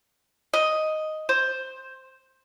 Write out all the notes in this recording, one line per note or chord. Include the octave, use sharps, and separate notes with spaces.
D#5
C5